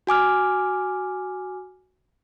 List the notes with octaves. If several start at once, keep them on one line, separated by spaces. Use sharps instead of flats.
F#4 G#5 D6 F6